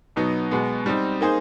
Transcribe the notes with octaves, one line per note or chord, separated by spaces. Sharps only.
B2 F#3 B3 D#4
B2 G#3 B3
G3 C4 D#4
A#3 D#4 G#4 C5